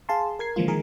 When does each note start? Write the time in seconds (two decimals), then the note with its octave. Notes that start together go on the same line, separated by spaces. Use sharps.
0.09 G#4 F5 A5 C6
0.39 A#4 G#6 C7
0.56 D3 E3 F3 G#3 A#3 F4
0.68 D#3 G#3 G#4 A#4